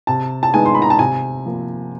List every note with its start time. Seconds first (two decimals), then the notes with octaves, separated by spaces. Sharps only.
0.07 C3 A5
0.43 A5
0.54 D#3 G#3 B3 G#5
0.66 C6
0.75 B5
0.82 A#5
0.90 A5
0.99 C3 G#5
1.46 F3 A#3